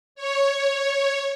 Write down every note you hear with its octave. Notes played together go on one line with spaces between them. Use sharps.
C#5